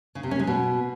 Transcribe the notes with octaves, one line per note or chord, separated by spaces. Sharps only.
C#3
C3
C#4
G#3
B2